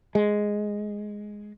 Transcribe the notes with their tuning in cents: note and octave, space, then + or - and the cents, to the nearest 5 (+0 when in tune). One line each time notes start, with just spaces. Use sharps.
G#3 +0